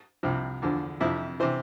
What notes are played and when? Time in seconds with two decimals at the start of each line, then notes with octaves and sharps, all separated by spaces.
0.23 C2 C3 F3
0.62 E2 D3 F3
1.00 F2 C3 F3 E4
1.40 C3 E3 C5